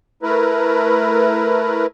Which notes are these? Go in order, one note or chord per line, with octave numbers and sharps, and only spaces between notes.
A3 E4 A#4 B4